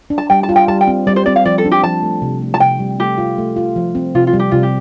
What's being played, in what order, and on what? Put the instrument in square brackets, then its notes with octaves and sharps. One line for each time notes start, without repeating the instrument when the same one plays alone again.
[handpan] D4
[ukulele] A5
[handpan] G3 [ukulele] G5
[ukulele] A5
[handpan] F4
[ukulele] G5
[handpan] G3 [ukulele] A5
[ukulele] G5
[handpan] C4
[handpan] G3 [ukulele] D5
[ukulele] C5
[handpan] C4 [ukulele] D5
[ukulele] F5
[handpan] F3 [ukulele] D5
[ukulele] A4
[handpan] D4
[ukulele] G4
[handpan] F3 [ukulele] A5
[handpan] A3
C3
A3
[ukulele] A5
[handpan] C3 [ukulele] G5
[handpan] G3
[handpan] A3 [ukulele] G4
[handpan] F4
A3
F4
F3
C4
[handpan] C3 [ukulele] F4
[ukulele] F4
[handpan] G3
[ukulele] G4
[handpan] C3 [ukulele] F4
[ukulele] G4